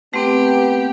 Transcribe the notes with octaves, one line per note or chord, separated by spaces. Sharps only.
A3 B3 C4 G4